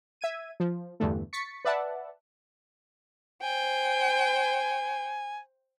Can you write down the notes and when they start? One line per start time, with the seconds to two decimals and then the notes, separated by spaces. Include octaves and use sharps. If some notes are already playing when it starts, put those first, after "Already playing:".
0.21 E5 G#6 D#7
0.60 F3
1.00 E2 G2 D3 A3
1.33 C#6 A6 B6 C#7
1.65 B4 D5 E5 F#5 A5
3.43 C5 G5 G#5